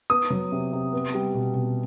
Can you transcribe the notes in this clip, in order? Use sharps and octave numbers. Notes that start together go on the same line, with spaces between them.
B3 D#6
F#3
C3
C3
B3
G3
B2
B2